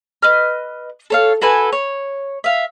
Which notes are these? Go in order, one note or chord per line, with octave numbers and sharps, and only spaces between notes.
B4 D#5 F6
A4 C#5 F5
F#4 A4 B4 G#5
C#5
E5 F5